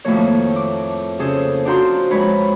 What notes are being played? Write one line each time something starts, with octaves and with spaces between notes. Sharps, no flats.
F2 A2 D#3 A3 A#3 C#5
D6
C#3 C#4 G#4 A4 C5
D4 F4 F#4 C5 A#5 C6
F2 G#3 B4 C#5 B5